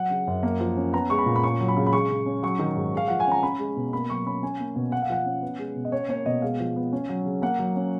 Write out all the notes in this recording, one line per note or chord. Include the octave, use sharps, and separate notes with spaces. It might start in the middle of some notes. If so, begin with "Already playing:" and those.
Already playing: F#3 F#5
C#3
F#2
A#3
F3
C#4
B3 A#5
G#3 C#6
B5
A#2
B5
C#4 C#6
F#3
B5
C#3
B5
G#3 C#6
C#3
C#4
F#3 C#6
D#3
G#2
G#3 F5
F3 F#5
G#5
C#4 A#5
C#4 B5
G#3
B2
A#3 B5
F#3 C#6
C#4 B5
C#4 G#5
A#3
B2
A#3 F#5
F5
F3 F#5
C#4
B3
G#3
B2
D#5
C#4 C#5
A#3 C#5
B2 D#5
G#3 F5
F3
B3
C#4
F#3
C#3
A#3 F#5
F#3
C#4